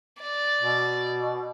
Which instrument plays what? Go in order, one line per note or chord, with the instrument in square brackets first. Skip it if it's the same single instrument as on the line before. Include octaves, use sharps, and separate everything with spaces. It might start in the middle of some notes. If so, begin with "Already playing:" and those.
[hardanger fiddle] D5
[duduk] B2